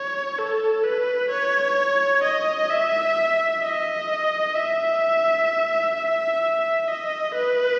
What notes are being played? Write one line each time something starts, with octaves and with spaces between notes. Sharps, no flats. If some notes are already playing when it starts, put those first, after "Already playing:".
Already playing: C#5
A4
B4
C#5
D#5
E5
D#5
E5
E5
D#5
B4